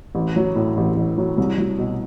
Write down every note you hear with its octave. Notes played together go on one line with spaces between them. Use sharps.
A1
F#3
A2
A1
A1
F#3
C2
F#3
B2